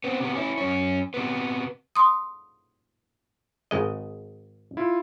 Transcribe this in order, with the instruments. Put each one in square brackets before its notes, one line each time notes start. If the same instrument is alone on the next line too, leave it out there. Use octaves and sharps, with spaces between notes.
[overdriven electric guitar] B3 C4
C3 B3
C#4 E4
F#2 C#4
C3 B3
[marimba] C6 D#6
[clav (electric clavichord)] G#1 G#3 D#5
[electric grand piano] E4 F4